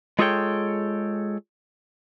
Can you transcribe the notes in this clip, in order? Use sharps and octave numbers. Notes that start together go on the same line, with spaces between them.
G#3 F4 G#4 A4 C#5 G5